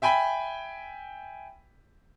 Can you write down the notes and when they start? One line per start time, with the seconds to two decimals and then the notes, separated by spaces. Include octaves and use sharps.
0.02 E5 G5 G#5 B5 B6